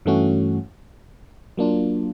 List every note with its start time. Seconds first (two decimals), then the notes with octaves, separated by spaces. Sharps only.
0.06 G2 E3 A3 C#4 F#4
1.57 F#3 A#3 D4 F4